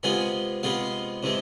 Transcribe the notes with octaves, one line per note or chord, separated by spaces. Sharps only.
C3 G#3 B3 F4 G#5
C3 G#3 B3 F4 F5
C3 E3 G#3